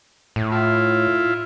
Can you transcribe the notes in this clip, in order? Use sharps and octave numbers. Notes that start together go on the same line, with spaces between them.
A2
E4 F4